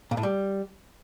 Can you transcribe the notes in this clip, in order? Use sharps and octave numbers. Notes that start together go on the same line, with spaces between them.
A#2
A2
G3